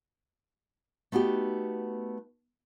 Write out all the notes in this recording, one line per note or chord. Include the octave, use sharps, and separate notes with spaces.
A3 B3 D#4 F#4 G4